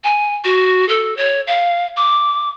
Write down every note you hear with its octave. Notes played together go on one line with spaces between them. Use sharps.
G#5
F#4
A4
C#5
F5
D6